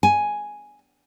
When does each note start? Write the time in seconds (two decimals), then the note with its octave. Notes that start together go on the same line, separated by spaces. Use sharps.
0.03 G#5